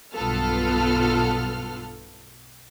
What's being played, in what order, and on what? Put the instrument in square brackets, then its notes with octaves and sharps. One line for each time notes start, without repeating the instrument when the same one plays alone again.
[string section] B1 G2 B3 F4 A4 F6